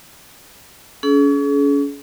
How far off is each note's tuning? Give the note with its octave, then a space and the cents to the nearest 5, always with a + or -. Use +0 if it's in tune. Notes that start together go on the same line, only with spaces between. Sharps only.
C#4 +35 G#4 +40